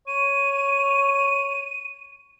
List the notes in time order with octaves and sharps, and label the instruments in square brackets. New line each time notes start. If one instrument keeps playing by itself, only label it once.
[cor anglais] C#5 [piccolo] D#7